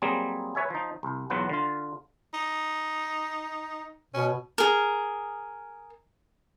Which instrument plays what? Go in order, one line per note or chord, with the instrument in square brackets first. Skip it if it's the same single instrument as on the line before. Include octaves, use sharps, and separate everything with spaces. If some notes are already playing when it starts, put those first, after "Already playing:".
[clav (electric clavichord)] F#3 G3 A#3 C4 G#4
B4 C#5 E5 G#5
F3 D#4
C2
B1 E2 F#3 F4 B4 F#5
D3 F4
[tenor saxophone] D#4
[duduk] B2 [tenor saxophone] C#4
[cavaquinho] G#4 A#4